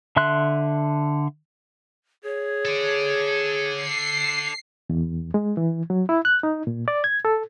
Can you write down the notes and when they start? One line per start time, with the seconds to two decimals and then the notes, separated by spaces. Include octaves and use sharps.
0.16 D3 E5 C6 F#6
2.24 G#4 C#5
2.65 A4 D5
3.74 C7
4.90 E2
5.34 G#3
5.57 E3
5.90 F#3
6.09 E4
6.25 F#6
6.43 D#4
6.67 A#2
6.88 D5
7.04 G#6
7.25 A4